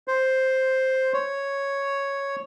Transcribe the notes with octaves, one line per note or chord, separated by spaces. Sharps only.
C5
C#5